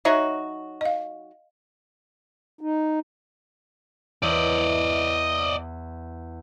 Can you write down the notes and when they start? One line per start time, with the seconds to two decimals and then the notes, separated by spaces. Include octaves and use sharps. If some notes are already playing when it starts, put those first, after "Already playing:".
0.05 F#3 D#4 F#4 C#5 E5
0.81 D#5 F5
2.61 D#4
4.23 E2 D5 D#5